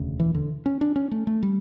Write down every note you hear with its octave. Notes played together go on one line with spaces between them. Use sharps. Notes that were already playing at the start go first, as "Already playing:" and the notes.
Already playing: E1 D2 C#3
E3
D3
C#4
D4
C#4
A3
A3
G3